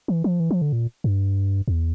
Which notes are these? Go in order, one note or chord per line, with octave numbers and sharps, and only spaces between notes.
E3
F3
E3
F3
D3
A#2
G2
E2